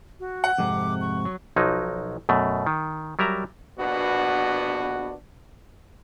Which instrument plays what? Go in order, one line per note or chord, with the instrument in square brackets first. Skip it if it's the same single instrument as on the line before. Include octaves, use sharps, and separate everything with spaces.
[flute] F#4
[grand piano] F#5
[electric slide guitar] F2 G#2 C3 [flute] D6
[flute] C#6
[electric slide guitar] F#3
[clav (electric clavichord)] B1 F3 F#3 D#4
F#2 B2 A3
D#3
F#3 G3 A#4 E5 A#5
[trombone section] A#1 B2 B3 D4 F#4